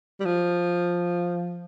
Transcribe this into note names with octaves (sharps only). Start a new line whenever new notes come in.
G3
F3